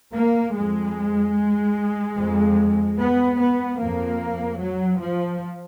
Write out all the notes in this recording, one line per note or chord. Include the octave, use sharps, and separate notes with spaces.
A#3
F2 G#3
F2
B3
B3
F2 A#3
F#3
F3